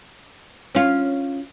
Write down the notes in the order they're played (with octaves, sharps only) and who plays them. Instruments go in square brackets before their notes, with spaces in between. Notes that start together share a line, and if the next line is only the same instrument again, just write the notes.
[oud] C#4 F4